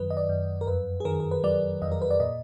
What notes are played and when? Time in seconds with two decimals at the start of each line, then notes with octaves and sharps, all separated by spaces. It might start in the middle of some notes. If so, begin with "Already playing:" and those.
Already playing: F#2 D#3 F#3 B4
0.10 D#5
0.17 D5
0.29 F#2
0.61 A#4
0.67 F2 B4
1.00 G#4
1.05 D#3 A#4
1.20 A#4
1.31 B4
1.44 F#3 D5
1.82 F2 D#5
1.92 A#4
2.02 B4
2.11 D5
2.20 A#2 D#5